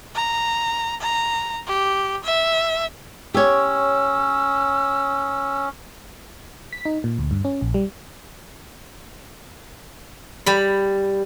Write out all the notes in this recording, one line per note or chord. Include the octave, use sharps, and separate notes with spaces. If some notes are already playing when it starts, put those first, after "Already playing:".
A#5
A#5
G4
E5
C#4 G4 C#5 E6
B6
D#4
A#2
D2
G2
C#4
A#1
G3
G3 B5